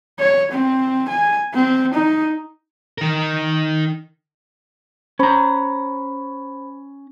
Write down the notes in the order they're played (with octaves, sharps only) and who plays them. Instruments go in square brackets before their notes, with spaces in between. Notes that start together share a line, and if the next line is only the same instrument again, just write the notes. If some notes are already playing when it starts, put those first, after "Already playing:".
[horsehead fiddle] C#5
C4
G#5
C4
D#4
[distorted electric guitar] D#3 A#4
[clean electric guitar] C#4 A#5 [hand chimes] C5 B5